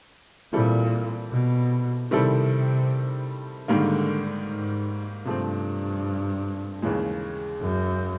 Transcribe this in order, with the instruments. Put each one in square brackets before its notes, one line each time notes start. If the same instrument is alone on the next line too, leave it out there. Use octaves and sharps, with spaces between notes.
[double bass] A#2 [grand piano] E3 G3 C4 E4 A4
[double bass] B2
[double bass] C3 [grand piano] D#3 G3 C4 E4 A4
[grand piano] G#2 D#3 G3 A#3 [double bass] D3
[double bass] G#2
[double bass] G2 [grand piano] C3 F3 A3 C4
[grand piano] D#2 C#3 E3 G#3
[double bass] F#2